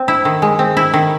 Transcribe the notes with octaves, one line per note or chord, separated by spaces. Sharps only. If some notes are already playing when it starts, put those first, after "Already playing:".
Already playing: C4
E4
D#3
G#3
C4
E4
D#3